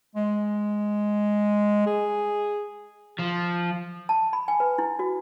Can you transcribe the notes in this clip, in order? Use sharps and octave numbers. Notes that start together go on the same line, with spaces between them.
G#3
G#4
F3
A5
B5
G#5
B4
E4
F#4